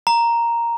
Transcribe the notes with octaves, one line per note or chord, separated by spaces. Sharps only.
A#5